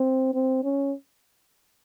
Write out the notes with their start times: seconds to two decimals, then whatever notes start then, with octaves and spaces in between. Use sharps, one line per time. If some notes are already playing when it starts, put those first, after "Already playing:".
Already playing: C4
0.34 C4
0.63 C#4